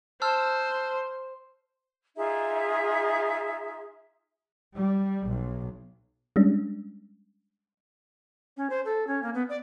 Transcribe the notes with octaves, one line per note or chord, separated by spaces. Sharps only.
C5 A5 E6 F6
D#4 F4 G#4 E5
G3
B1
G3 G#3 C#4 D4
C#4
C5
A4
C#4
A#3
B3
D5